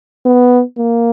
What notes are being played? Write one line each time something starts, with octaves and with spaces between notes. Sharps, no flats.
B3
A#3